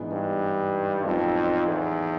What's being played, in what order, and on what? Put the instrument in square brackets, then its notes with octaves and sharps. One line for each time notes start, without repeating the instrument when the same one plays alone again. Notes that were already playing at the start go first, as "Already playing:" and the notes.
Already playing: [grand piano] G#2 E3 G#3 B3 D4
[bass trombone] G2
[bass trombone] F2 [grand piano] A2 F#3 B3 D#4 F#4
[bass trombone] E2